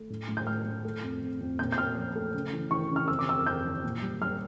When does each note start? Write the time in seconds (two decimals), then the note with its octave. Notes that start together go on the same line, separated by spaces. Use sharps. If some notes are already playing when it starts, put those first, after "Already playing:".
Already playing: A3
0.10 A2
0.28 A2
0.37 G6
0.47 A2 F6
0.65 A2
0.84 A3
1.03 F2
1.22 F2
1.41 F2
1.59 A#2 G6
1.72 G6
1.78 A#2 F6
1.96 F3
2.15 A3
2.34 C#3
2.53 E3
2.71 E3 C#6
2.90 C#3
2.96 F6
3.08 F2 E6
3.19 D6
3.28 F2 E6
3.46 F2 G6
3.65 E3
3.84 A#2
4.02 G3
4.20 G3 F6